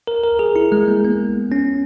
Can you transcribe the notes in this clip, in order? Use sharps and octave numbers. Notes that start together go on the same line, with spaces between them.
A#4
A#4
G#4
E4
G#3
A#3
B3
C#4